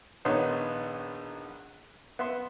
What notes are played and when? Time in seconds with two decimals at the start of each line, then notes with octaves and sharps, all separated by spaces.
0.25 A#1 D#3 B3 D#4 C#5 C6
2.19 B3 E5 C6